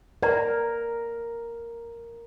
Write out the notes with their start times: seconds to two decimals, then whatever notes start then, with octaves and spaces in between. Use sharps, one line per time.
0.23 A#4 B4 D5 A#5